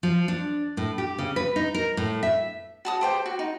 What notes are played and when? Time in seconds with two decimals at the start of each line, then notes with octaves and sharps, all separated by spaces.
0.03 F3
0.28 D4
0.77 A2
0.98 G4
1.18 C#3
1.36 B4
1.56 D#4
1.75 A#4
1.97 A2
2.23 E5
2.85 F#4 A5 D#6
3.01 G4 C5 G5
3.26 F#4
3.39 D#4